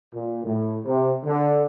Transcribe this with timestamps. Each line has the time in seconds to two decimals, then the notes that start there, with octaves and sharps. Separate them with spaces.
0.14 A#2
0.44 A2
0.85 C3
1.25 D3